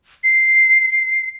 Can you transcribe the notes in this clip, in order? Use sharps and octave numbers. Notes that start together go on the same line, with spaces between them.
C7